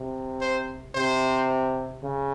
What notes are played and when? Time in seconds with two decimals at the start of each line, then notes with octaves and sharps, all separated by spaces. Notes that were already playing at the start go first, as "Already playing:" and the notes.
Already playing: C3
0.41 C5
0.95 C3 C5
2.04 C#3